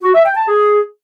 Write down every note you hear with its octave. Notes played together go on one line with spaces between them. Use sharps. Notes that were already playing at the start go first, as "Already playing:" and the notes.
F#4
E5
G5
A5
G#4